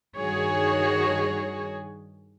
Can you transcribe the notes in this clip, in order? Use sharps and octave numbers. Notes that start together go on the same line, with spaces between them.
G2 D#3 F#4 G#4 C#5